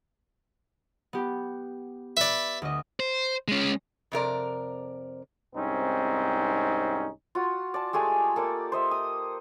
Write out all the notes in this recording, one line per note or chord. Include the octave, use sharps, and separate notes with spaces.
B3 G4
B4 D5 E5
D2 D#5
C5
G#3 C#4
F2 C3 A#4 D5
C2 G#2 C4 C#4 D#4
F4 F#4
D5 A5
G#3 A3 G4 G#5
A#3 A4 D5
C5 D#5 E5
D#6